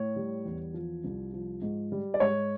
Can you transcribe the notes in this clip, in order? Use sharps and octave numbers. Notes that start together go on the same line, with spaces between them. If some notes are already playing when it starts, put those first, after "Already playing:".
Already playing: A2 C#5
G3
E2
F3
C2
F3
G#2
G3
D5
G#2 C#5